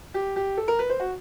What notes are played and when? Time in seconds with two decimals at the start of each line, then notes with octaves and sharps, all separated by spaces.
0.14 G4
0.36 G4
0.57 A4
0.68 A#4
0.79 B4
0.90 C5
1.00 F#4